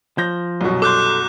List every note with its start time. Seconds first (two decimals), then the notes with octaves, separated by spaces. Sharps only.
0.18 F3 G6 A#6
0.61 C2 F#2 B2
0.82 A4 C6 D6 F#6 G6